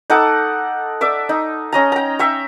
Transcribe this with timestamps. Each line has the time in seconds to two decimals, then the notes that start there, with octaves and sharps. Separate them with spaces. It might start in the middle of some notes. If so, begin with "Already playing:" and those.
0.10 D#4 A4 F#5 D6
1.01 D5 E5 D6
1.29 D#4
1.72 C#4 D#5 A#5
1.92 G5 A#5
2.19 E5 G5 C#6